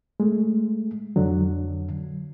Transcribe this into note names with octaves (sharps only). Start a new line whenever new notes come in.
G#3 A3
F2 D3 F#3